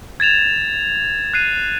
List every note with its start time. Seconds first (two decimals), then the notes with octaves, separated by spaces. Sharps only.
0.20 G#6 A6 E7 F7
1.34 F#6 C7 D#7